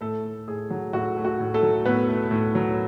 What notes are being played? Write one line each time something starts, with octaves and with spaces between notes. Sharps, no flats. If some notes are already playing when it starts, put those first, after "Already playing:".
A2 A3 A4
A3
A2 G#4
F#3
A2 F#4
A3
F#4
A2
A3 A4
F#3
A2 B3 B4
A3
A2
F#3